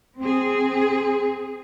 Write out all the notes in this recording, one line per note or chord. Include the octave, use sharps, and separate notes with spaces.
C4 G#4